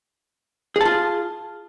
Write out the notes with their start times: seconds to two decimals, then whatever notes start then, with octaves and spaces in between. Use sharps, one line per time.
0.76 G#4
0.81 A5
0.85 F4